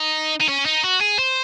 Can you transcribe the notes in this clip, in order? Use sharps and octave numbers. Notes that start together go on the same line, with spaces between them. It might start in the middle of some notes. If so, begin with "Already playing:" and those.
Already playing: D#4
D#4
C#4
D#4
F#4
G#4
C5